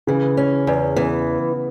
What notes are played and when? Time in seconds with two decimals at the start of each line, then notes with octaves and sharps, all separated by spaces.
0.07 C#3 E3
0.37 C#4
0.67 E2
0.96 E3 B3